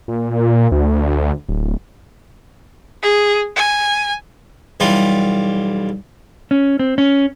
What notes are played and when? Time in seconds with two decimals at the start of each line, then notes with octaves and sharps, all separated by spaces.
0.08 A#2
0.72 D2
1.49 D1
3.03 G#4
3.57 G#5
4.80 B1 E3 G3 F4
6.51 C#4
6.79 C4
6.98 C#4